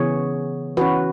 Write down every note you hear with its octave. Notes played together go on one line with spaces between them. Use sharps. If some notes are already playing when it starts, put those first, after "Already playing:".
Already playing: C#3 E3 B3 G#4 C#5
E3 C#4 F#4 B4